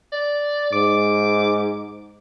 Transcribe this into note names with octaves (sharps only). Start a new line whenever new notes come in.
D5
G#2 D6